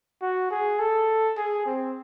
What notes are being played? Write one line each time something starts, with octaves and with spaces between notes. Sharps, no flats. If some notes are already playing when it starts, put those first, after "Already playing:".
F#4
G#4
A4
G#4
C4